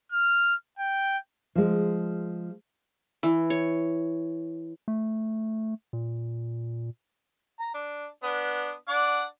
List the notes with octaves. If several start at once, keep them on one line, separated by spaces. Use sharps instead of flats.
F6
G5
F3 G#3
E3
C#5
A3
A#2
A#5
D4
B3 D4
D4 D5 F#5